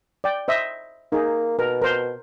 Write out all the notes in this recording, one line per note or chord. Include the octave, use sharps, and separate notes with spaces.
D5 G5
C5 D#5 E5
A#3 D#4 G#4
B2 A#4
A#4 C5